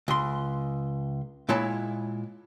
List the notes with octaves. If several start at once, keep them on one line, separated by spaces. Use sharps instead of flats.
C#2 C6
A#2 G#3 E4 C#5 A5